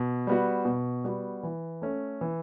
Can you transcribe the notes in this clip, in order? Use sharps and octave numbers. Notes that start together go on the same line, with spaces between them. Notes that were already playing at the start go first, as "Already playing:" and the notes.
Already playing: B2
G3 B3 F#4
B2
G3 B3 F#4
E3
A3 C#4
E3